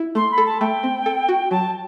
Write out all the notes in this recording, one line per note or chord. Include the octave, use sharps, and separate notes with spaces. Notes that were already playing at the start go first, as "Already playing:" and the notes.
Already playing: E4
A3 C6
B5
A4
A5
A3 G5
C4
A4
F#4
F#3 A5